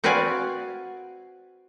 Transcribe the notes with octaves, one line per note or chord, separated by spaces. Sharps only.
C4 F#4 B4 D5 F5 G#5